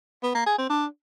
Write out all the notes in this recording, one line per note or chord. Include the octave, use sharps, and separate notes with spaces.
B3
A#3
G#4
C4
D4